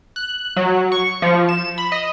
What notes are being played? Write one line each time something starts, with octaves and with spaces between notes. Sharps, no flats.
F#6
F#3
C#6
F3
E7
B5
D#5